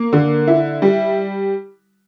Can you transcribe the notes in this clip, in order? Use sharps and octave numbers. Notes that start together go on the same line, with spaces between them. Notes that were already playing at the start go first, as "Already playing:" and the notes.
Already playing: A#3
D3
E4
G3